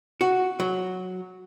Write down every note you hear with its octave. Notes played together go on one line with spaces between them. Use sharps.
F#4
F#3